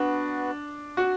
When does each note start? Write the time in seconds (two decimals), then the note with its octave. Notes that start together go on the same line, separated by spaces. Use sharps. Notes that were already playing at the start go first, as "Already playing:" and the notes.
Already playing: B3 D4 F#4 B4
0.97 F#4